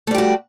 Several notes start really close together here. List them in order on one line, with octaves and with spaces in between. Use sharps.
A3 G3 G4 F#4